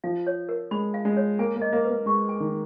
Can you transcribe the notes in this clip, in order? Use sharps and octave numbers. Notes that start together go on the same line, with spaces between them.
F3 F5
C#5
A#4
G#3 B5
F5
G#3
C#5
A#3 G#5
A#3
D#5
A#3
B4
A#3
G#3 C#6
G#5
D#3